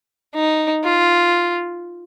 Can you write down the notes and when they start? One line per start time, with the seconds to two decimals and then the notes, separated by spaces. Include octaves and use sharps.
0.35 D#4
0.83 F4